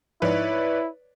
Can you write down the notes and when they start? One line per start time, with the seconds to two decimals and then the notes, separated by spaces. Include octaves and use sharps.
0.22 G#2 F3 D#4 E4 B4 C#5 D5